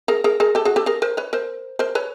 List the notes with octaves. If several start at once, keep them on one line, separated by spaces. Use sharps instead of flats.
G#4 A#4
G#4 A#4
G#4 A#4
G4 A4
F#4 G#4
G4 A4
G#4 A#4
A#4 C5
B4 C#5
A#4 C5
A#4 C5
B4 C#5